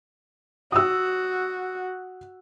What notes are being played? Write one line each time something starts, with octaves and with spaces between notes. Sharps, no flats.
F#4 D#6 E6